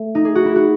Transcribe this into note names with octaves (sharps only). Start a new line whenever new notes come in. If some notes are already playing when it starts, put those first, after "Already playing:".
Already playing: A3
D#4
G#4
F#4
E4
F#4